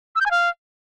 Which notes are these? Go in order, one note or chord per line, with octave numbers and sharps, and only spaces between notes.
E6
G6
G#5
F5